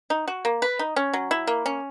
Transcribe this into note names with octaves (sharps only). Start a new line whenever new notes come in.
D#4
F#4
A#3
B4
D#4
C#4
F#3
E4
A#3
C#4